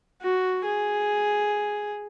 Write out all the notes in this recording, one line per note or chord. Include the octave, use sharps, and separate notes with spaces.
F#4
G#4